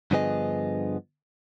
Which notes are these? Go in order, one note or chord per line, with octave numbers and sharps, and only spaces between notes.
G2 D3 F3 B3 G#4 D#5